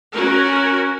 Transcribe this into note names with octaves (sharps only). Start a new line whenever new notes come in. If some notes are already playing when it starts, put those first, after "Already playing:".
C#4 F#4 A#4